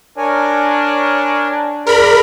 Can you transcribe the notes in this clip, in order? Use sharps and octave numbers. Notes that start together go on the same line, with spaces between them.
D4 A#4 C#5 G#5
F2 G#4 A#4 D5 B5 C6